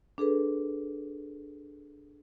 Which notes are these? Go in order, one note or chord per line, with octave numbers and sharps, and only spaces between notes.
D4 G#4 A4 B4